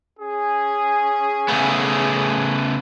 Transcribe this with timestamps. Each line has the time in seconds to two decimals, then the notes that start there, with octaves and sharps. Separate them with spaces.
0.17 C#4 G#4
1.48 C#3 A3 B3